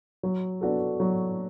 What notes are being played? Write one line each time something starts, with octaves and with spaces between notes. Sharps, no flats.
F#3
B3 D4 F#4 A4
F#3